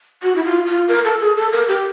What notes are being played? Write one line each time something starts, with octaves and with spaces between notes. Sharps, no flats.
F#4
E4
F4
F4
A#4
A4
G#4
A4
A#4
G4